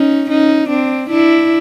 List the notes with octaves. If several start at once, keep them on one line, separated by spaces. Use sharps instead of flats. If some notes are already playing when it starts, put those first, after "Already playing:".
Already playing: C#4 D#4
C#4 D#4
C4 D4
D4 E4